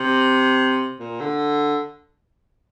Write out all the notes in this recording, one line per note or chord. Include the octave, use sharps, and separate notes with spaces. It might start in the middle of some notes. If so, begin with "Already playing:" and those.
Already playing: C3
A#2
D3